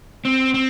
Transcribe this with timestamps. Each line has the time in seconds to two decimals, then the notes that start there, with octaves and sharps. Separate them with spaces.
0.25 C4
0.54 C4